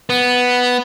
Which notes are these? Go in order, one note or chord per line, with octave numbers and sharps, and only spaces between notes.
B3